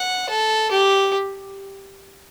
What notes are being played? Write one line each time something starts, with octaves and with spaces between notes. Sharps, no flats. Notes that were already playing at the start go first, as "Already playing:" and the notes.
Already playing: F#5
A4
G4